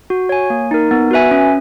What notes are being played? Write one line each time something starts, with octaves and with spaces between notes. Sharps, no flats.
F#4
C#5 G#5
A#3
D#4 A#4
B3
F#4 B4 E5 G#5
C#4